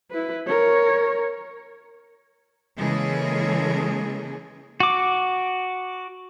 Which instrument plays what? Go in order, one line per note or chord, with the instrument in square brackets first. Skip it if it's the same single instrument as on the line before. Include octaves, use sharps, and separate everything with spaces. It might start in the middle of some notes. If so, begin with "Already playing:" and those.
[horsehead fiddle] E4 B4
A#4 C#5
[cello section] C#3 E3 G#3 A#3 G#4 A4
[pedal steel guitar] F#4 D6